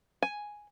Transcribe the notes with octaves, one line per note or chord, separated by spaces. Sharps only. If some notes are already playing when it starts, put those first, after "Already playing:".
G#5